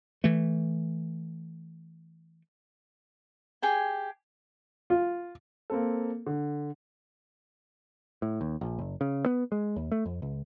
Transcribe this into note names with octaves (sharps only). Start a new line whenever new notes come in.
E3 A3
G4 G#4 G5 G#5
F4
A#3 C4 A4
D3
A2
D#2
A#1
F#1
C#3
B3
G#3
D#2
A3
F2
C#2